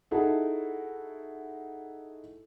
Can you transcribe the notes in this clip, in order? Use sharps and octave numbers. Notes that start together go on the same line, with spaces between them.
D#4 E4 F#4 G#4 A4